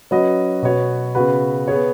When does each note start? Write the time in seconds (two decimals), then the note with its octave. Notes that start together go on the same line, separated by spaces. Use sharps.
0.11 F#3 C#4 F#4 B4 D#5
0.62 B2 B3 F#4 C#5
1.15 C#3 B3 F#4 B4
1.68 B3 G#4 C#5